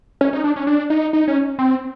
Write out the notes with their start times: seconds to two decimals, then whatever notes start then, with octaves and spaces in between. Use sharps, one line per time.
0.21 C#4
0.33 D#4
0.44 D4
0.56 C#4
0.67 D4
0.90 D#4
1.13 D#4
1.28 C#4
1.59 C4